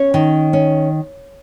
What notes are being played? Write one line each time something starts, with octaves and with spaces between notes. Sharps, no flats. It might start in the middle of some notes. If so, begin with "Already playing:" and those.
Already playing: C#4 C#5
D#3
C#4